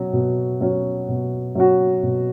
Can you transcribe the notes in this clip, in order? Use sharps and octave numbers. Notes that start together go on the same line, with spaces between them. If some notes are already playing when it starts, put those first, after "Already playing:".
Already playing: B2 F#3 C#4 F#4
B2
F#3 C#4 F#4
B2
F#3 C#4 F#4
B2